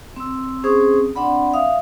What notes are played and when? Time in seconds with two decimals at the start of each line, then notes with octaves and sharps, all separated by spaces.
0.16 C4 E6
0.64 C4 C#4 G#4 C5 C#6 D#6
1.15 C4 D4 D5 F#5 B5
1.54 E5 F5 D#6